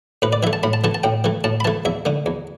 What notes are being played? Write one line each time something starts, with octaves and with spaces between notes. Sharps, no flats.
A2 B4
D5
E3 A3 E5
A5
A2 B5
A5
E3 A3 A5
A5
A2 G5
E3 A3
A2 A5
B5
E3 A3 A5
E2 E5
D3 A3
E2